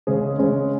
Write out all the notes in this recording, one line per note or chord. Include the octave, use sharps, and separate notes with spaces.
C#3 G#3 C#4 G#4
C#3 G#3 C#4 G#4